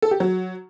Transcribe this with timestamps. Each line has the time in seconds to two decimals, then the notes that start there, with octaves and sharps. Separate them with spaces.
0.02 A4
0.11 G4
0.20 F#3